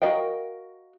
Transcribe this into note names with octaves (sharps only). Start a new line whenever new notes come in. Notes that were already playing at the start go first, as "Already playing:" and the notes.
F#4 A#4 D#5 F5 G5